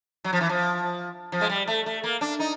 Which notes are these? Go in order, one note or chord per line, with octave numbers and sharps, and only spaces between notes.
F#3
F3
E3
F3
F3
G#3
G3
A3
A3
A#3
D4
D#4